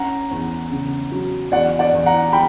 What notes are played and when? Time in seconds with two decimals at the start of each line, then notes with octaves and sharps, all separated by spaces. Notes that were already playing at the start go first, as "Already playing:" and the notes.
Already playing: C#4 F#5 A#5
0.31 E2
0.72 C#3
1.12 F#3
1.52 E2 D5 F#5
1.79 D5 F#5
1.93 E2
2.06 F#5 A#5
2.33 G5 B5